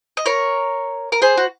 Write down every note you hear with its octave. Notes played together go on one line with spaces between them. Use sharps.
D#5
A#4 C#5
A#4
G#4 C5
F#4